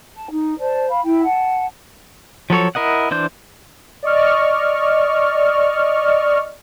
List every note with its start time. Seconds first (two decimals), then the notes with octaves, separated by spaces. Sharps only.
0.14 A5
0.31 D#4
0.57 C5 D5 A5
0.88 F5 B5
1.02 E4 G5
1.24 F#5 A5
2.50 F3 F#3 A4 C#5
2.75 E4 A#4 D#5 F#5
3.11 E3 D4 C5 G6
4.03 D5 D#5 C#6 F6